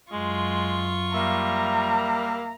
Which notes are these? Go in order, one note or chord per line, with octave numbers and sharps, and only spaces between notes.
F#2 G#3 F4 C#6
G3 A#3 E5 A#5